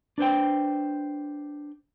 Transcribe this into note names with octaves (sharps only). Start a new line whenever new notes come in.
D4 B4 C5 G5